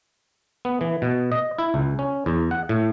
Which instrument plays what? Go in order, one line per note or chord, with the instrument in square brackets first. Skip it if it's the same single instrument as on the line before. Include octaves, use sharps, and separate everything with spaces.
[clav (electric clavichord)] B3
E3
B2
D#5
E4
C#2
C#4
E2
F#5
A2